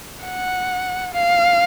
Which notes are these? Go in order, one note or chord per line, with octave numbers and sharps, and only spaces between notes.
F#5
F5